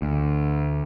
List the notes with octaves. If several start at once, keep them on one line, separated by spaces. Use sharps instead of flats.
D2